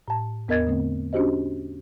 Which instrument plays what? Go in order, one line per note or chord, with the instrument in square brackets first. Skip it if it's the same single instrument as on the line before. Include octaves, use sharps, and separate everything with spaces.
[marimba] A2 A5
E2 B3 A#4 D#5 G#6 A6
D3 A3 C4
C#4 D4 F#4 G4 C5 D#5